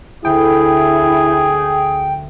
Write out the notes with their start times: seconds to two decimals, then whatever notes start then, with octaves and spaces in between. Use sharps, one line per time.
0.25 D2 E4 G#4 G5